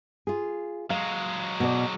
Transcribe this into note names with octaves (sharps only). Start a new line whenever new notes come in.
F4 G#4
F#3 G#3 F5
B2 D5